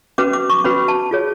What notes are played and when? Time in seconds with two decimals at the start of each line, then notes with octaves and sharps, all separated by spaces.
0.18 C#4 F#4 B4 D6
0.33 D6
0.50 C#6
0.64 C#4 F#4 B4 B5
0.88 A5
1.11 F4 G#4 C#5